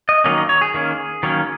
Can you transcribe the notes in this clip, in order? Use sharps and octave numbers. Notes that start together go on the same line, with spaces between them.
D#5
D#3 F#3 A#3 C#4 D#5
D#5
C#5
G#4
D#3 A#3 C#4
D#3 F#3 A#3 C#4